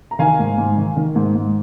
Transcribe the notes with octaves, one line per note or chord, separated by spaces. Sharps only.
A#5
D#3 F5 G#5
G#2
G#2
D#3
D#3
G#2
G#2